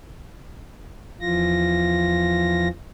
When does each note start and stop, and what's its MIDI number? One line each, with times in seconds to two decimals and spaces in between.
1.21 2.68 40
1.21 2.68 52
1.21 2.68 53
1.21 2.68 65
1.21 2.68 94